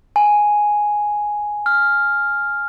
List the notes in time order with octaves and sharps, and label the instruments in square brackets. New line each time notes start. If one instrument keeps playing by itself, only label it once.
[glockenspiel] G#5
F6